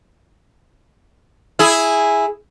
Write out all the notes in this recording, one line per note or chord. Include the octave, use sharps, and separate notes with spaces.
E4 G#4